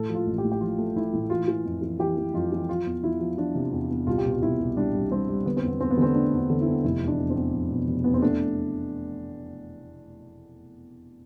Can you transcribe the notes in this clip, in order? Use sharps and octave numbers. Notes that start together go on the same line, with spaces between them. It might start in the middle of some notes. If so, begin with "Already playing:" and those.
Already playing: A2 A4
F3
F4
A1
G4
A2
G4
F3 F4
A3
A3 E4
A2
E3 F4
E3
F2
E3
E3 G4
E3
F2 F4
E3
F3 F4
E2
F3 E4
F3
F3 D4
C3
E2
E2
C2 F4
G4
B2
F4
C2 E4
C2
G3 D4
C2
G3 C4
G3
D3 B3
C4
E2
B3
E2 C4
B3
D3 C4
A3 D4
E2
D4
D3
E4
E2
F1 E4
E2
D4
E2
C4
E2
F1
B2
F1
E2 B3
C4
A3 D4